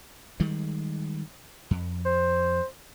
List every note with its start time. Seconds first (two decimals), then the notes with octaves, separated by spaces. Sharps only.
0.40 D#3 G3 G#3
1.71 F2
2.05 C5